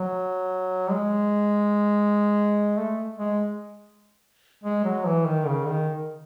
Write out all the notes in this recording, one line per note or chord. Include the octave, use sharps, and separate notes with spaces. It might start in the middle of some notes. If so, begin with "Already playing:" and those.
Already playing: F#3
G#3
A3
G#3
G#3
F#3
E3
D#3
C#3
D#3